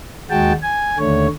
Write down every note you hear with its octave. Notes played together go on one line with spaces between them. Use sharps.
D#2 G#3 F#4 G5 A5
G#5
D#2 D3 A3 C#5